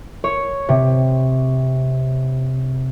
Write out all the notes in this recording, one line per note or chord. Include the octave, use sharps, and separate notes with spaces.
C#5
C3